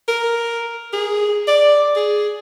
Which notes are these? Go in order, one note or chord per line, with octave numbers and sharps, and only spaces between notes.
A#4
G#4
D5
G#4